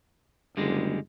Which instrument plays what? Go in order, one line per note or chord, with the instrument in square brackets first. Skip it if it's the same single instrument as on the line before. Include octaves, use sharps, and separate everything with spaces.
[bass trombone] F#1 [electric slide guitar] D3 G3 G#3